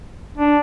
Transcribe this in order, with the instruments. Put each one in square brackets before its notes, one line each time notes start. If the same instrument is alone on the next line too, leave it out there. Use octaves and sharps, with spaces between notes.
[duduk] D4